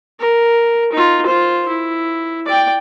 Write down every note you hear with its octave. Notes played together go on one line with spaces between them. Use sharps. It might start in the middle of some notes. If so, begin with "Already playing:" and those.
A#4
D#4 F4
F4 C5
E4
D5 G5